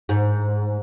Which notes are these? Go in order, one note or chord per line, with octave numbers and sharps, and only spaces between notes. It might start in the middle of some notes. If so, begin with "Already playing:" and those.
G#2